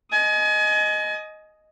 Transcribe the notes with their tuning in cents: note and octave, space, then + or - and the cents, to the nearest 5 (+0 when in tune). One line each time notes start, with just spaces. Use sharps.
D#5 +0 G#5 +30